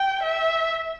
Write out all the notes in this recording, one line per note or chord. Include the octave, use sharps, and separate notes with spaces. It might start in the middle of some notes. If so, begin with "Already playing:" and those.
Already playing: G5
E5